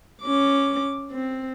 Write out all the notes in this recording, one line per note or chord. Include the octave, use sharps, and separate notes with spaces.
C#4 D6
C4